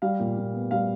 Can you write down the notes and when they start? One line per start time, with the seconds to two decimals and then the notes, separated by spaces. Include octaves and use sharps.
0.02 G3 F5
0.20 A#2
0.37 A#2
0.53 B3
0.71 G3 F5